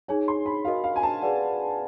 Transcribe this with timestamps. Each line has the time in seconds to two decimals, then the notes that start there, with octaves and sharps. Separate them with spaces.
0.08 D#4 G#4 C#5 G#5
0.28 C6
0.46 B5
0.65 F#4 A#4 D#5 F5
0.84 F5
0.96 G#5
1.03 A5
1.21 G#4 B4 D5 F#5